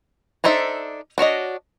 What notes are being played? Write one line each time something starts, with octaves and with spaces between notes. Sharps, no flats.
D4 D#4 A4 C5 E5
D4 F#4 C#5 D#5